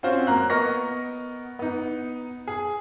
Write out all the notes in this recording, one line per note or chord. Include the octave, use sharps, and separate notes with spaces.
C4 C#4 F4 F#4 C5
A#3 A#5 F#6
B3 A#4 D#5 C#6 A#6
B3 D#4
G#4